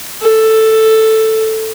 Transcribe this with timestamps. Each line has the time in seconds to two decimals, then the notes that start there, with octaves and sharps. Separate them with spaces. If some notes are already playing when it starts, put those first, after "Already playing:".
0.21 A4